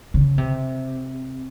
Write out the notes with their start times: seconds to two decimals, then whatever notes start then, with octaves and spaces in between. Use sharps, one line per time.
0.14 C#3
0.38 C3